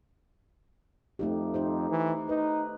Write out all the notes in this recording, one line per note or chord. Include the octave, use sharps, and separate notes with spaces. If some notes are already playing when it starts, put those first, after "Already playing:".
F2 A3 D#4 G4
D#4 G4 C5
E3
D#4 B4